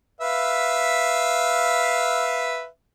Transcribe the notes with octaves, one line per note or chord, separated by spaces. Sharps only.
B4 E5 F5